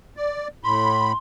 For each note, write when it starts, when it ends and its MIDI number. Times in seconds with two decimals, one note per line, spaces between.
0.17 0.48 74
0.64 1.12 45
0.64 1.12 83
0.64 1.17 84